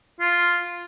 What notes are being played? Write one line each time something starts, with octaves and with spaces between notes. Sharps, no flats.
F4